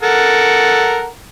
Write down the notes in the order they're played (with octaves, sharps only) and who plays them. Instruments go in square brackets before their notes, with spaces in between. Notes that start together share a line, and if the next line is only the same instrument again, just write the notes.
[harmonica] A4 A#4 F#5